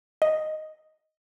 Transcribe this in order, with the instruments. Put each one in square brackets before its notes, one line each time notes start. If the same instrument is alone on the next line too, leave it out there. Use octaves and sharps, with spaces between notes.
[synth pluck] D#5